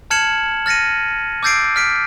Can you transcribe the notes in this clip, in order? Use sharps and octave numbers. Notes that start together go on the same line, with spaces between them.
A5 F6 G#6 C#7 E7 F#7
F6 A6 A#6 C#7 D#7
D6 E6 G6 A6 C7 D7
F6 B6 D7